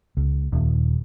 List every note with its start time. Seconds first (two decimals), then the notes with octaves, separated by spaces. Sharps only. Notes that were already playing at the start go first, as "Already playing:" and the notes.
0.17 C#2
0.52 D#1